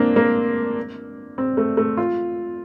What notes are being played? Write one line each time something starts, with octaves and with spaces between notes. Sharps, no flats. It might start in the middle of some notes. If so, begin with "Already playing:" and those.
Already playing: A#3 C4 D4
A#3
C4
A3
A3
F4